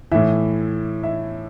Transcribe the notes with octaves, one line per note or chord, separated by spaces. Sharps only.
A2 E3 E5
E5